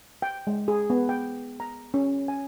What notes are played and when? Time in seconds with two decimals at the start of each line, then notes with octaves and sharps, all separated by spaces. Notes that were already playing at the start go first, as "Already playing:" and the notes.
0.22 G5
0.47 G#3
0.68 G#4
0.90 B3
1.09 G5
1.60 A#5
1.94 C#4
2.28 G#5